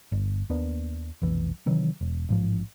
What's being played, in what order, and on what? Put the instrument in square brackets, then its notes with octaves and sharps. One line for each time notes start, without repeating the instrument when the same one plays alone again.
[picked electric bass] G1
D#2 A#3 B3 D4
F1 B1 E3
C3 D#3 E3 F#3
E1
A1 G#2 F3